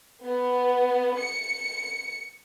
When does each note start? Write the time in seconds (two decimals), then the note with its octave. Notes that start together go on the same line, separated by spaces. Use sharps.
0.24 B3
1.17 C#7